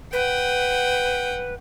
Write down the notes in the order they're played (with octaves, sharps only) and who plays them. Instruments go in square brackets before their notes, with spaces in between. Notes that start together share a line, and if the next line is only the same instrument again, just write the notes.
[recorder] B4 [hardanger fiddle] F#5 G5